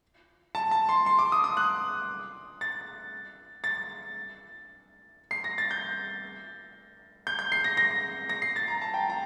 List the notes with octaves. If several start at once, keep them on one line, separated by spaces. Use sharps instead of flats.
A5
A5
C6
C6
D6
D#6
D#6
F#6
A6
A6
C7
A#6
A6
G6
G6
G6
C7
A#6
A#6
A#6
C7
A6
A#5
A5
G5
A#5